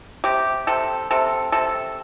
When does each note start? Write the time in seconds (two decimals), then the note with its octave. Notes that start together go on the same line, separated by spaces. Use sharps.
0.24 C3 G4
0.67 C3 A4
1.11 C3 A4
1.52 C3 A4